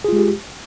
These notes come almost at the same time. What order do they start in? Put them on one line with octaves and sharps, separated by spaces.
G#4 F4 G#3 G4